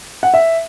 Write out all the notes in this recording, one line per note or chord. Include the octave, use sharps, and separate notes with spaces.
F#5
E5